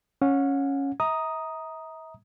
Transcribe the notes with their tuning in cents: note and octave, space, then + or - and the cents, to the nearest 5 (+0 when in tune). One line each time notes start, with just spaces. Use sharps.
C#4 -5 F#5 -35
E5 -40 A#5 +10 D#6 +0